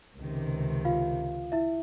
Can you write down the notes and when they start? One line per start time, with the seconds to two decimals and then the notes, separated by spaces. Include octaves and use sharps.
0.17 C#2 C3 D#3
0.85 F4 F5
1.52 E4 E5